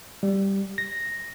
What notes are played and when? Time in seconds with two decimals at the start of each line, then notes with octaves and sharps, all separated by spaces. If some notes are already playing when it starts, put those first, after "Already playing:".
0.23 G3
0.78 A#6